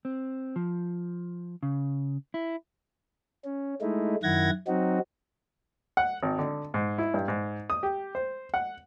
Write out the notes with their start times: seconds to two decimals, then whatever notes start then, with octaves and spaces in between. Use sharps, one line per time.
0.05 C4
0.56 F3
1.63 C#3
2.34 E4
3.45 C#4
3.81 G#3 A3 D#4 E4
4.23 F#2 D#3 E4 F#5 G#6 A#6
4.67 F#3 C4 D#4 F#4
5.97 F#5
6.23 G#1
6.38 D3
6.74 G#2
6.98 E4
7.14 G2
7.28 G#2
7.70 D#6
7.83 G4
8.15 C5
8.54 F#5